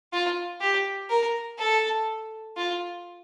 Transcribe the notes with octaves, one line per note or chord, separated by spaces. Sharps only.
F4
G4
A#4
A4
F4